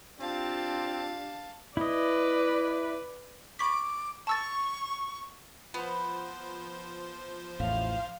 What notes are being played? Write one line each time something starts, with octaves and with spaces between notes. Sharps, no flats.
C4 D4 F4 G4 F5 A5
E4 B4 D5 D#5
B5 C#6 D6 B6
A5 C#6 E6 A6
F3 B3 C5
A1 E2 A2 F5